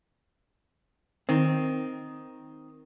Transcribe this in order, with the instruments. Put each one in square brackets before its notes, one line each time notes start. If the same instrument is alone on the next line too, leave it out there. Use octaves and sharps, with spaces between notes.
[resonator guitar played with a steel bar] D#3 [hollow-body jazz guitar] C4